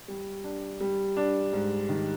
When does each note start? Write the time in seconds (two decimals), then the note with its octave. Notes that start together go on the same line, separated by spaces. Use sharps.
0.08 G3
0.44 D4
0.81 G3
1.17 D4
1.53 G#2
1.89 D#3